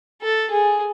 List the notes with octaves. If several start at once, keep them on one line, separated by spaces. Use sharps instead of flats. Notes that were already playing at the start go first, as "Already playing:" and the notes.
A4
G#4